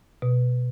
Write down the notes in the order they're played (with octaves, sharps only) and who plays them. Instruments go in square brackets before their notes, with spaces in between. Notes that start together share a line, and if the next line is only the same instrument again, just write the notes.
[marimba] B2